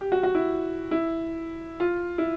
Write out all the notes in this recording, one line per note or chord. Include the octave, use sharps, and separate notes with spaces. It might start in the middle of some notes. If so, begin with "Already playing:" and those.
G4
F#4
F#4
E4
E4
F4
E4